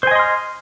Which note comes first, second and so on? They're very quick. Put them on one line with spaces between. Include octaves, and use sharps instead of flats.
C5 G#5 D#5 C6 F6